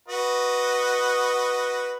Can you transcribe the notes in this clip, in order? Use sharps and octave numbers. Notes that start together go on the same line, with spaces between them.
F#4 B4 D#5